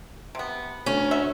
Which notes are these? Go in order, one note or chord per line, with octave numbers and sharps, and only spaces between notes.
C3 B3
D2 C#4
F#4 E5